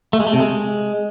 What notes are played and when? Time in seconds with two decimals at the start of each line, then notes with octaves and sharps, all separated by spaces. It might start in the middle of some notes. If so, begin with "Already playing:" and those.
0.13 A3
0.20 G#3
0.27 A3
0.33 C3
0.40 G#3